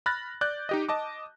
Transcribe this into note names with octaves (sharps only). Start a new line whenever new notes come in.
B5 F6 F#6 A6 A#6
D5 F#6 G6
D#4 G4 D#5
D#5 A5 D6